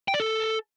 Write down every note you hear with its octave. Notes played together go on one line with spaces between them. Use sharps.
G5
D5
A4